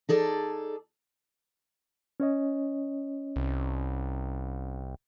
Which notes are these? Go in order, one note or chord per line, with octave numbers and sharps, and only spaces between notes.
D#4 G#4 A4 D5
C#4 C#5 D#5
C2